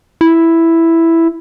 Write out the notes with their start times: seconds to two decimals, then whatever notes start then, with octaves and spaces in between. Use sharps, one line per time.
0.21 E4